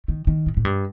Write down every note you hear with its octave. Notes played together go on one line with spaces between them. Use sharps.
D#3
D#3
A2
A2
G2